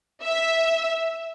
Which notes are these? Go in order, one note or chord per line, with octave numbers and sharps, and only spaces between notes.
E5